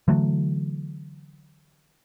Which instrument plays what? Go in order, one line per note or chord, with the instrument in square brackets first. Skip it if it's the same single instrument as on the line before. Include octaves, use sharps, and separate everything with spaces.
[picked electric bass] D3 E3 F#3 A3